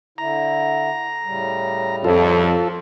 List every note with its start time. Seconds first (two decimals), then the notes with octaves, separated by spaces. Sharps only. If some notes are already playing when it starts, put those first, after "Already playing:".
0.18 D3 E4 A#5
1.24 A2 C#3 G3
2.04 F2 F4 A4